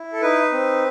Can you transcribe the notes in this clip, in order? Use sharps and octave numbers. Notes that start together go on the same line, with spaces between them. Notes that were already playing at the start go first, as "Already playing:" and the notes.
Already playing: E4
A4
D#4 B4
C4